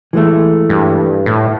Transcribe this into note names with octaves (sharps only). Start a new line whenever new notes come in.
E3 G#3 A3
G2
A2